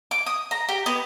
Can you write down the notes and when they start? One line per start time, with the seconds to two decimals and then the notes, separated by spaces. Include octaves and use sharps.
0.11 D6
0.26 D#6
0.51 A#5
0.69 G4
0.86 B3